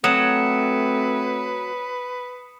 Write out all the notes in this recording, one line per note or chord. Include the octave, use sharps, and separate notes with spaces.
F#3 A3 C4 B4 D#6 C#7 E7